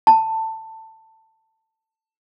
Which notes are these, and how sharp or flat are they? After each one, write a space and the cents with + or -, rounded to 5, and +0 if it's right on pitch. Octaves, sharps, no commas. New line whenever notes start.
A5 +15